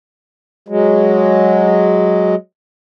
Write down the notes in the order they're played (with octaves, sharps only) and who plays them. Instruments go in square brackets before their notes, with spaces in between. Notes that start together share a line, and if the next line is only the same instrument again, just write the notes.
[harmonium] F#3 G#3